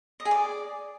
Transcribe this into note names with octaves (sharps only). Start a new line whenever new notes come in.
D#5
G#4
D5